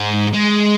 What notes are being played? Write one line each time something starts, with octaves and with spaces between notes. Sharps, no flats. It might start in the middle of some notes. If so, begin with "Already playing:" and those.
Already playing: G#2
G#3